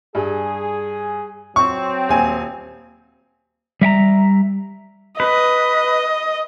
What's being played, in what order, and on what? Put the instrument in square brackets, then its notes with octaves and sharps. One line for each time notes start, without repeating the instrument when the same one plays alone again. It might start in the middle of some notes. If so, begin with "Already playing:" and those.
[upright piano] G2 [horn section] G#4
[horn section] F#3 C4 [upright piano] C#6
[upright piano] D#1 G#5
[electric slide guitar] G3 E5 G5 A#5
[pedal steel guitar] B4 [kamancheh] D#5